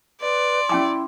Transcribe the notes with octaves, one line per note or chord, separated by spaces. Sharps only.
B4 D5 C6
C#4 E4 G5 D6